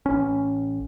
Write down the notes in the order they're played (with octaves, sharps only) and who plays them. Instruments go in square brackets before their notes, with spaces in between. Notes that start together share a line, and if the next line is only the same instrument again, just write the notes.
[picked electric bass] A1 C#4